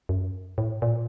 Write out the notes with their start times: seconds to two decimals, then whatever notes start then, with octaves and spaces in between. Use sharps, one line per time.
0.09 F#2
0.58 A2
0.82 A#2